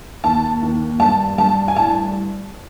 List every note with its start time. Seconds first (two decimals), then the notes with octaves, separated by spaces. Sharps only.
0.24 D#2 A5
0.62 D#2
1.00 G2 A5
1.38 G2 A5
1.68 G#5
1.76 A2 A5